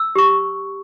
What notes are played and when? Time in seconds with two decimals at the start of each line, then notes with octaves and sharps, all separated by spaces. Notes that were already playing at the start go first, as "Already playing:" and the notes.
Already playing: E6
0.15 G4 C#6